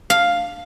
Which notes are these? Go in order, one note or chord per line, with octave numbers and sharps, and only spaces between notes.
F5